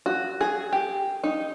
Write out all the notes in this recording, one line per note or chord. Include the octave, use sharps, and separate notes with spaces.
F#4
G#4
G4
D#4